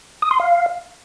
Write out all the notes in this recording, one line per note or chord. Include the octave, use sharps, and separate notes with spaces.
D#6
C6
F5